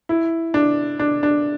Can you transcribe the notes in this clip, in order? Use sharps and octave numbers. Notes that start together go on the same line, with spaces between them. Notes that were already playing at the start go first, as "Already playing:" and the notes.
E4
D4
D4
D4